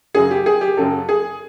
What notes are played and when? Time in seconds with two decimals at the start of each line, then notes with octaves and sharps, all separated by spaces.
0.14 F#2 C#3 F#3 G#4
0.31 G4
0.46 G#4
0.61 G4
0.77 F#2 C#3 F#3 A4
1.09 G#4